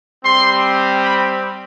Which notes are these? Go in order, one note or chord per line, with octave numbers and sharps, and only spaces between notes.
G3 C4 G4 C6
B5